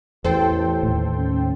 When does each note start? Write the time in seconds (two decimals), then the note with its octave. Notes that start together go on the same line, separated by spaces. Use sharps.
0.24 A1 E2 A4 C5 G5
0.83 D#2 A2
1.18 C#4